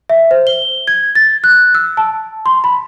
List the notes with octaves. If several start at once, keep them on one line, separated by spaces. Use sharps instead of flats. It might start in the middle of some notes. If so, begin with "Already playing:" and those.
E5
C5
G7
G#6
A6
F#6
E6
A5
C6
B5